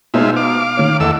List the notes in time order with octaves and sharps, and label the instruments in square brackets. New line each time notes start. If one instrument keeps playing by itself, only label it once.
[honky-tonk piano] B2 D#4 C5 [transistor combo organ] G#3 F4 E5
[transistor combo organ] F5 D6
[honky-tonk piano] D#3 C#4
[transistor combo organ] E2 A3 E6 [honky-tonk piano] D#5 F#5